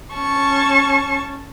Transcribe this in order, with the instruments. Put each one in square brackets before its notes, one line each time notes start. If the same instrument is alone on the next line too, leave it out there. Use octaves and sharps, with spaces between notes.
[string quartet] C#4 A5 C#6